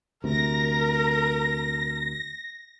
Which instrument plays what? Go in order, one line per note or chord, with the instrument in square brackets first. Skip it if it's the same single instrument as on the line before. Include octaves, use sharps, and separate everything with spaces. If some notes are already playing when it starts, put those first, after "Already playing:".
[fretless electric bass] D2 C3 [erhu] A#4 [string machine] A#6